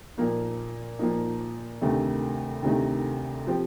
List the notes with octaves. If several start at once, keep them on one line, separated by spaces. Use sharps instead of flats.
A#2 F3 A#3 D#4
A#2 F3 A#3 D#4
D2 C3 D#3 A3 D#4
D2 C3 D#3 A3 D#4
F3 C4 G4